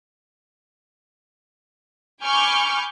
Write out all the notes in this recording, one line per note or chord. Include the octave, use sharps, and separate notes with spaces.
G#5 B5 C#6 D6 F6 G6